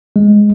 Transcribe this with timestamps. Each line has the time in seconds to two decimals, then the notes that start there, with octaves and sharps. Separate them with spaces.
0.16 G#3